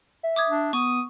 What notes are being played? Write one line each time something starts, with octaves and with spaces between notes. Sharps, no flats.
E5
D6 D#6 G#6
D4
B3 C#6 D#6